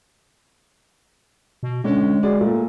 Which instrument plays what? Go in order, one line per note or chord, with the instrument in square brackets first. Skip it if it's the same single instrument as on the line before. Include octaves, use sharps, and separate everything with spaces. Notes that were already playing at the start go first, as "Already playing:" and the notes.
[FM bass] B2
[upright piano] D3 C#4 [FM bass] G#3
[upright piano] F#4 G#4 D5
A#2 A3